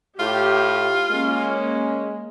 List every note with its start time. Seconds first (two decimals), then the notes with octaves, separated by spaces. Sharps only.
0.19 A2 F4 G4
1.11 G#3 A#3 C#4